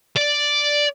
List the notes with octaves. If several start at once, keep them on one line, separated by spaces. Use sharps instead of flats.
D5